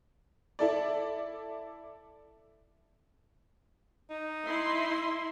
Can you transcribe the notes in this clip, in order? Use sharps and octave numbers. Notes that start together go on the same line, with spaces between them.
E4 A4 D5
D#4
E4 E5 C6